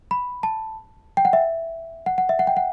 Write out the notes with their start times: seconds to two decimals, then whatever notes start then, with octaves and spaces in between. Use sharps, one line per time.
0.11 B5
0.43 A5
1.17 G5
1.25 F#5
1.33 E5
2.06 F#5
2.18 F#5
2.29 E5
2.39 F#5
2.47 G5
2.57 F#5